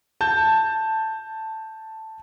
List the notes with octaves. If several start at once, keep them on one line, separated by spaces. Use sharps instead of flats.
A5 G6